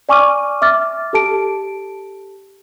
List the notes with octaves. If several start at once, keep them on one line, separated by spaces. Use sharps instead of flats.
D5 G#5 C#6 D6 F6 D#7
E5 D6 F6 A6
G4 A4 A5 D7